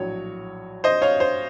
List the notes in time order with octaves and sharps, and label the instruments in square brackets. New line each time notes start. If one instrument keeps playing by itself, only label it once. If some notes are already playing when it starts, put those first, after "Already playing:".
Already playing: [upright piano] A#1 A2 F#3 C#5
C5 D#5
C#5 F5
C5